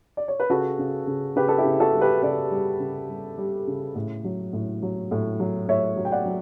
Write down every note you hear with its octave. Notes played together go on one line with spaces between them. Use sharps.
D5
C#5
B4
C#3 F#4 A4
C#3
C#3
C#3 G4 B4
A4
E4 G4
C#3
F#4 A4
G3
G4 B4
C#3 B4 D5
G3
C#3
G3
G3
C#3
A2
F#3
A2
F#3
A2
F#3
A2 C#5 E5
F#3
G5
D5 F#5
F#3